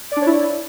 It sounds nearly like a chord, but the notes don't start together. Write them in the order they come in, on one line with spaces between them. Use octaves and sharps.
D5 D4 C#5 E4